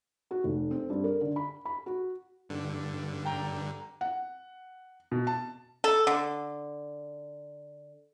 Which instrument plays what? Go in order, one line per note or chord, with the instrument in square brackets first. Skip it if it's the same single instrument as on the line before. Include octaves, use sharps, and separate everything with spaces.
[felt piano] F#4
F1
C4
G2
A#4
D3
B5
B5
F#4
[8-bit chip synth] G2 D3
[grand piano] G5 A#5
[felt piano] F#5
B2
A5
[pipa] A4
D3